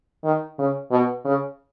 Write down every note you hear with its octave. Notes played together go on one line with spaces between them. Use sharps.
D#3
C#3
B2
C#3